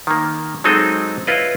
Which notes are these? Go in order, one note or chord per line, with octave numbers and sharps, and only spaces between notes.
D#3 A#3
F#3 G#3 C4 D#4 A4 D#5
E4 F4 B4 C#5 D#5